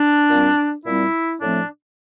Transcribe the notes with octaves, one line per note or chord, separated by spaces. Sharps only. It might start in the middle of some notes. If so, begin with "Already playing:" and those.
Already playing: D4
A#2 G3 C4
A#2 G3 C4 E4
A2 F3 A3 C4 D4